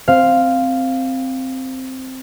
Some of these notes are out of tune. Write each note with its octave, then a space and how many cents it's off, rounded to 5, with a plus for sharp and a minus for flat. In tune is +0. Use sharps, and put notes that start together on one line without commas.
C4 +0 C5 +0 F5 +0